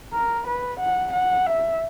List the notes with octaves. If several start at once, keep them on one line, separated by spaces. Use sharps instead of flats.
A#4
B4
F#5
F#5
E5